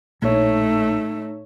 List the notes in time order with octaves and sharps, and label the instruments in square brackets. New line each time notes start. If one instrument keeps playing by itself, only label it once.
[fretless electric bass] A#1 [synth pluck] A2 C#5 [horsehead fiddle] A3 D#4